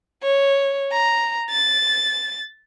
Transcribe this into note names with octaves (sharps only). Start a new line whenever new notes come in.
C#5
A#5
A6